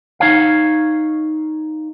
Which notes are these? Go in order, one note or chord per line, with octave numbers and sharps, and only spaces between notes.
D#4 C#5 F5